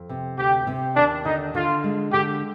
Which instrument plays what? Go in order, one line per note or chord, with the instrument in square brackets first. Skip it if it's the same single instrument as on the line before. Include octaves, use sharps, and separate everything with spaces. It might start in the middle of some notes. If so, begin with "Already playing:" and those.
Already playing: [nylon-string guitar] F2
C3
[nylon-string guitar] D2 [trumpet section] G4
[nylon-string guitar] C3
[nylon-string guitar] D#2 [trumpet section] D4
[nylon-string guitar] D3 [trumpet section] D#4
[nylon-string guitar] D3 [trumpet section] F4
[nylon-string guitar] G#3
[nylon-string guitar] D3 [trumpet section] G4